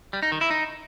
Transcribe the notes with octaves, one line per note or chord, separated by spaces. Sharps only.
G3
D#4
D#3
E4
D#4